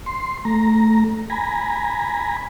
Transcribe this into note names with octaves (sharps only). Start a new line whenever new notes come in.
C6
A3 A#5
G#5 A#5 B5